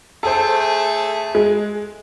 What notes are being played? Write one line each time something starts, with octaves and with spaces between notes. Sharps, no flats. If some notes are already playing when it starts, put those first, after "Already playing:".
A3 G#4 A4 C5
G#3